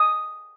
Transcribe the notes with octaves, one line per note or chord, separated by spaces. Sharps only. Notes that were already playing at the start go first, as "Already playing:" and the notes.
Already playing: D#6